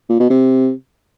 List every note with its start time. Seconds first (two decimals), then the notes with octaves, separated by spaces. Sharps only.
0.09 A#2
0.20 B2
0.30 C3